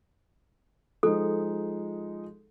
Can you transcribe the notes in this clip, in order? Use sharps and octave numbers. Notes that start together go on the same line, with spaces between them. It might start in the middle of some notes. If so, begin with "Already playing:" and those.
F3 G#3 D#4 A4